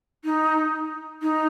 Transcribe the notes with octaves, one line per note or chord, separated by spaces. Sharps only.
D#4
D#4